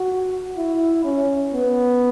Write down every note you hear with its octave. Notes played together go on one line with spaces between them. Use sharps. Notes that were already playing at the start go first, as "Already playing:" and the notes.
Already playing: F#4
E4
C#4
B3